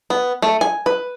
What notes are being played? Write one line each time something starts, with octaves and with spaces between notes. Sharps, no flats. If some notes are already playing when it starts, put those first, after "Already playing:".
B3
A3
G#5
B4